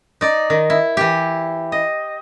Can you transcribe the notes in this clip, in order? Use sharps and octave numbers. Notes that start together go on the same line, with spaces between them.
D#4 D5
D#3
E4
E3 G4
D#5